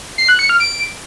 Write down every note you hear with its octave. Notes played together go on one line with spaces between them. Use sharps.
C7
F#6
C#7
F6
D7